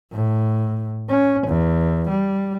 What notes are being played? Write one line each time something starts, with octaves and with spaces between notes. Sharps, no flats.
A2
C#4
E2
G3